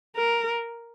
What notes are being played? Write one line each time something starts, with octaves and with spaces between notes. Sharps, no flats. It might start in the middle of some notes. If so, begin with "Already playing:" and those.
A#4